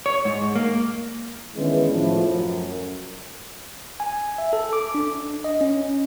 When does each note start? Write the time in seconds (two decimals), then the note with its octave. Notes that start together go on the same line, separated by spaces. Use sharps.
0.06 C#5
0.25 G#2
0.56 A#3
1.56 D#3 E3 G#3 B3 C#4 D4
1.91 A2 F3
2.29 F#2
4.00 G#5
4.38 E5
4.53 A4
4.73 D6
4.95 D4
5.44 D#5
5.61 C#4